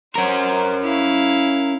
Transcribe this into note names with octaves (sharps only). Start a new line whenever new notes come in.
C#4 A#4 C5
E4 F5